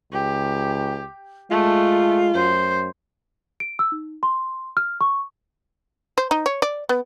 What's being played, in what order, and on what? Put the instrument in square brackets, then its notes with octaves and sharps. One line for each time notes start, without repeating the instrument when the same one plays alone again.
[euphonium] C#2 [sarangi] G4
[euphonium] G#3 [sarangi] A3 [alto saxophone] F4
[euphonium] F#2 [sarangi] C5
[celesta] D7
E6
D#4
C6
F6
C#6
[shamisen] C5
D#4
C#5
D5
B3